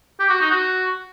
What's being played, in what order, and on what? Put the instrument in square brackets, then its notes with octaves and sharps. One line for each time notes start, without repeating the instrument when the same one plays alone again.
[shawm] G4
F#4
D#4
F#4